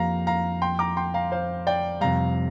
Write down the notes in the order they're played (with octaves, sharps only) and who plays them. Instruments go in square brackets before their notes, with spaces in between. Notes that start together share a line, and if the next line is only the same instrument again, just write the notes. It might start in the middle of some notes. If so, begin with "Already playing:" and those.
Already playing: [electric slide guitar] F2 F3 A#3 G4 [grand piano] F5 A#5
[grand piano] F5 A#5
G5 C6
A#5 D6
G5 C6
F5 A#5
C5 F5
D5 G5
[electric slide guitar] F2 C3 G3 [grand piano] F5 A#5